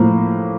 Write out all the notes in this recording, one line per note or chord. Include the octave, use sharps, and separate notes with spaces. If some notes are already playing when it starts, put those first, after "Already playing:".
Already playing: A2 F3 A#3